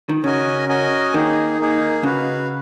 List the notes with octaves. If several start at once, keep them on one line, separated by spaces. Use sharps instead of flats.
D#3
C#3 C#4 F#4 A#4 D#5 G#5
C#4 F#4 A#4 D#5 G#5
D#3 A#3 D#4 G#4
A#3 D#4 G#4
C#3 F#4 B4 F5